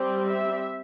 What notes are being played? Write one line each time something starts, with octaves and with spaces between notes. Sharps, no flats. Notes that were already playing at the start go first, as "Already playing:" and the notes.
Already playing: G3 C4
E5